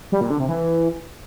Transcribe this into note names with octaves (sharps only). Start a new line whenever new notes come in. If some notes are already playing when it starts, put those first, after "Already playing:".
G3
A#2
D3
C3
E3